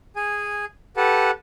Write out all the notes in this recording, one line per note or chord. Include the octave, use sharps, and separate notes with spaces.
G#4 G#5
G4 A4 B4 F#5 A5